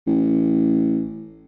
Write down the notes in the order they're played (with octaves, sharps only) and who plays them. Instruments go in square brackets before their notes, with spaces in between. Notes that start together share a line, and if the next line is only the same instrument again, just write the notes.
[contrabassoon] A1